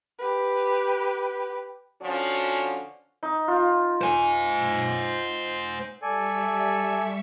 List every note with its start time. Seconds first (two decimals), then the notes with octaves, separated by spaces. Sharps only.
0.18 G4 B4
2.02 D3 F3 C#4 F#4
3.23 D#4
3.48 F4
4.01 C5 G#5
6.02 G3 A4 D5 E5 G#5 C#6